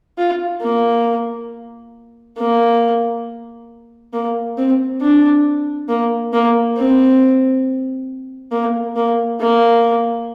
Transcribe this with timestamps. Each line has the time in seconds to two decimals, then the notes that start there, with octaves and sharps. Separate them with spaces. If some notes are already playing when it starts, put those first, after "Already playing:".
0.18 F4
0.62 A#3
2.38 A#3
4.13 A#3
4.57 C4
5.01 D4
5.89 A#3
6.33 A#3
6.77 C4
8.52 A#3
8.96 A#3
9.40 A#3